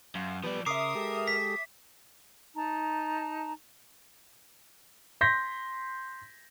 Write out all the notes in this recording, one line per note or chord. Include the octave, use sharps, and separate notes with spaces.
F#2 F5 C6
F3 G3 B3 B4 D5
C#3 A#4 E5 C6 D6 D#6 C7
G#3 G4 A4
B6
D#4 A5 A#5
C6 G6 A#6 B6